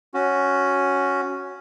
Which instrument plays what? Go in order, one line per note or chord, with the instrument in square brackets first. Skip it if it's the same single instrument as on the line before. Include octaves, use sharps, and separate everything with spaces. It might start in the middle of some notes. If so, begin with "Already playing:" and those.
[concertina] C#4 F#4